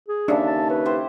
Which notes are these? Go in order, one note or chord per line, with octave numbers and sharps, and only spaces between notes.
G#4
D#2 C#3 D4 A4 E5
A5
B4 C#5
E4 G4 C5